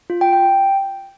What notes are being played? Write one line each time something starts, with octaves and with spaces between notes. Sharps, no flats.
F4
G5
G5